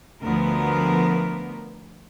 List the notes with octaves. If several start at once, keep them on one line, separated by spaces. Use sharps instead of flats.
D2 F3 B3 A#4